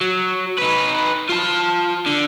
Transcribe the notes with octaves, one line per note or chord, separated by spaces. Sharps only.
F#3
D#4 B4
F4 A5
D3